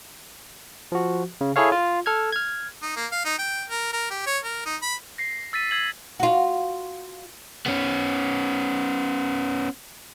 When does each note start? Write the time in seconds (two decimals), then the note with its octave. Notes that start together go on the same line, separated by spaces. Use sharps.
0.92 F3 F#4
1.41 C#3
1.56 E4 G#4 A4 C#5 F5
1.72 F4
2.06 A4 F6 G#6
2.32 F6 G#6
2.83 D#4
2.96 A#3
3.12 F5
3.25 D#4
3.39 G5
3.70 A#4
3.93 A#4
4.10 G4
4.26 C#5
4.44 A#4
4.66 D#4
4.82 B5
5.18 A#6 C7
5.53 E6 A6 B6 D#7
5.71 E6 G#6 C7 F#7
6.20 F4 F#4
7.66 B3 C#4